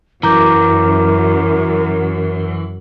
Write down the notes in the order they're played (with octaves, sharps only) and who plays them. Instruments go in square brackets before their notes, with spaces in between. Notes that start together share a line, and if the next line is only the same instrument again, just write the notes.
[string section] F#2 [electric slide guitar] E3 [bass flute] A#4 [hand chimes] A#5 D6 G6